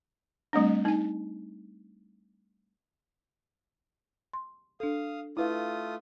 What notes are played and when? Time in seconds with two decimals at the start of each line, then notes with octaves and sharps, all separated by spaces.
0.53 G3 A3 C4 D4
0.85 D#4 G#5
4.33 C6
4.80 D4 A4 F5 D#6
5.37 A3 E4 F4 B4 F5 D#6